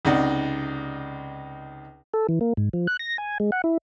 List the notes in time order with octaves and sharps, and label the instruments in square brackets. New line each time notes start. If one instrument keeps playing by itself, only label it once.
[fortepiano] C#2 C3 D#4 D5 F#5
[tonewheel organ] A4
E3
A#3
G#2
F3
F#6
A#6
G#5
G#3
F#5
E4